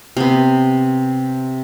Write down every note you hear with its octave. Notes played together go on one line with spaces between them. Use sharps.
C3 B3